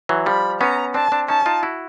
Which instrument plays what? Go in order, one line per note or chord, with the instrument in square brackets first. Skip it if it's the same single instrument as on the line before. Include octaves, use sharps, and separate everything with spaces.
[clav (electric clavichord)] E3 F#3
[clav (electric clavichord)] F3 G3 [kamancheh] B5
[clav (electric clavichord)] B3 C#4 [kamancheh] A#5
[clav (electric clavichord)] C4 D4 [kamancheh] A5
[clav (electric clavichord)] C4 D4
[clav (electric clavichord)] C#4 D#4 [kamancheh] A5
[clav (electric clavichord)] D#4 F4
E4 F#4